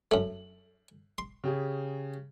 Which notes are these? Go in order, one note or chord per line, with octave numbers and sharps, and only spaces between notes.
F#2 A3 F#7
C6
C#3 G4 G#4